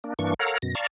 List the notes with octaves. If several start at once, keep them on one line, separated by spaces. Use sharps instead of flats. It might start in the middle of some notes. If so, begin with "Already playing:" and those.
A#3 D4
G2 E3 A#3 D4 C#6
A4 A#4 C#5 F5 F#5 A#5
F#2 B2 A#6
D5 F5 A5 A#5 C#6